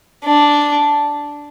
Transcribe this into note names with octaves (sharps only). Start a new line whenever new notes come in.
D4